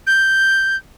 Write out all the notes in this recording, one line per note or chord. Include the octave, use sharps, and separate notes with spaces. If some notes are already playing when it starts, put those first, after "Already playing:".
G6